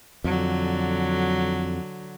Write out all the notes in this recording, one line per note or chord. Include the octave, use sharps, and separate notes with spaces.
F2 D3 F#3